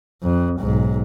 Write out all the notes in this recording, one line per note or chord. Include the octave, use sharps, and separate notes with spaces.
F2
B1 G#2